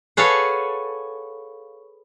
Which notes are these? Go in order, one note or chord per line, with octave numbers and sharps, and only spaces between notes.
G#4 A4 B4 C#5 F5 F#5